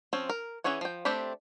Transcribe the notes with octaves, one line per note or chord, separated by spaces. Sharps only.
F3 C4 C#4
A#4
E3 C#4 G#4 C#5 F#5
F3 G5
A3 C4 D4 G4 B5